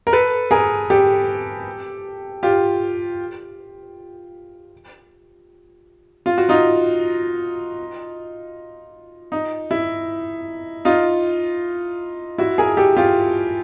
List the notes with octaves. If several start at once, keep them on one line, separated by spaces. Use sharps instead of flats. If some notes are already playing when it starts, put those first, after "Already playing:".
A#4
A4 B4
G#4 A#4
G4 A4
F4 G4
F4
F#4
D#4 F4
D#4
E4
D#4 F4
E4 F#4
G#4 A#4
G4 A4
F4 G4